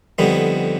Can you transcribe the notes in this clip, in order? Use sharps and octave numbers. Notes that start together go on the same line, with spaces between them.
F2 D3 G3 B3 D#4